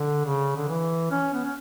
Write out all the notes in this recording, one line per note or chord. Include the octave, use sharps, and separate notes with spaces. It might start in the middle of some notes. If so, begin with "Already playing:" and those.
Already playing: D3
C#3
D3
E3
C#4
B3
C#4